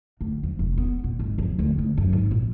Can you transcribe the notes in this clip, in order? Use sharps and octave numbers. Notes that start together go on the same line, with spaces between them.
D2
F2
F1
B3
A#2
G#1
F2
D2
D2
F#2
G#1
A#1